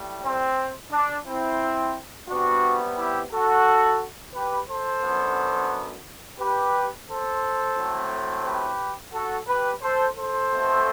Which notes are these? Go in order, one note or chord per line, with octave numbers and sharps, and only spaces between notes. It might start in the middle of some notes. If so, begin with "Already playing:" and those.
Already playing: A2 G3
C4
D4
C4 E4
C3 G3 B3 D4 F#4
E4 G4
F#4 A4
G4 B4
A4 C5
F#2 D3 F#3 B3
G4 B4
A4 C5
A2 F#3 A3 C4
G4 B4
F#4 A4
G4 B4
A4 C5
A4 C5
B2 A3 C4